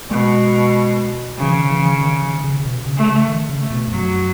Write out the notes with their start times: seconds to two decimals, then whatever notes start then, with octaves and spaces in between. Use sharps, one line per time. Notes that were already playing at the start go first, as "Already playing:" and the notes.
0.10 B2 G#3
1.38 C#3 E3
1.54 D#3
1.70 E3
1.86 D#3
2.01 D#3
2.22 D#3
2.44 C#3
2.60 C#3
2.65 B2
2.86 C#3
2.97 A3
3.08 C#3
3.28 D#3
3.49 C#3
3.60 A3
3.70 B2
3.87 G#2
3.92 F#2 F#3